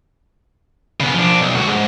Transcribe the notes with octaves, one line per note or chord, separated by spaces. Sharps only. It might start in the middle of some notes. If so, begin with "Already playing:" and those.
C#3 B3
F3 D4
B1
C#2 F#4
G#2